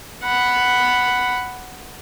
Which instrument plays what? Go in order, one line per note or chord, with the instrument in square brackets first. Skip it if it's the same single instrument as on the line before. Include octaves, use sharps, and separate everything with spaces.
[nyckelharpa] F#5 B5